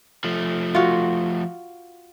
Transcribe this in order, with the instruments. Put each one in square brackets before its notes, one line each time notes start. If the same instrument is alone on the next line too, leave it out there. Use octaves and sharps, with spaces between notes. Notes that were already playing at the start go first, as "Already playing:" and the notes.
[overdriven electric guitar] F3 A3
[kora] F4 F#4